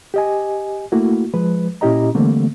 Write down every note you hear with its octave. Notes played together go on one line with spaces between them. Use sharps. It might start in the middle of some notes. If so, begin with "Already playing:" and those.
G4 D#5 G#5
A3 A#3 E4 F#4
F3 G#3 B4
A#2 C#4 E4 G4 D#5 A#5
D3 E3 G3 A3 A#3 C4